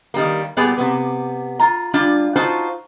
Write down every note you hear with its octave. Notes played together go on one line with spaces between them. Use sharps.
D#3 G3 A#3
A#2 G3 B3 G4 G#4
C3 B3
F4 A#5
G3 D4 F4
D#4 F4 F#4 C5 A5